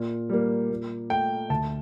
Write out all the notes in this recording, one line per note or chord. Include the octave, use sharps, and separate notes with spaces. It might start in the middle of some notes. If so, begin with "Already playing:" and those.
Already playing: A#2
G3 A#3
A#2
A3 G5
D2 A5